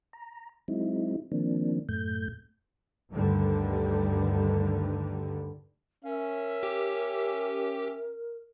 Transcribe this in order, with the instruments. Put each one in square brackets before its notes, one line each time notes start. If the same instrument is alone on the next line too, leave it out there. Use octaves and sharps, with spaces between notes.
[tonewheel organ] A#5
F#3 G#3 C4 D#4 E4
D#3 F3 A#3 C4 D4
F#2 A2 A3 G6
[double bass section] D2 G2 D3 D#3 G3
[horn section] C#4 E5 [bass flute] A#4
[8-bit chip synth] G4